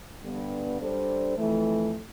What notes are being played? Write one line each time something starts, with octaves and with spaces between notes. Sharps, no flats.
G2 D3 G3 B3
G3 D4 A4 C5
F2 E3 A3